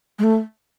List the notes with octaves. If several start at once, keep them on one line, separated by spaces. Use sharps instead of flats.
G#3
A3